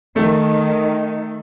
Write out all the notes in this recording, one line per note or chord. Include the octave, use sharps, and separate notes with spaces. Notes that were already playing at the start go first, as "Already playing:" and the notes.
D#3 A3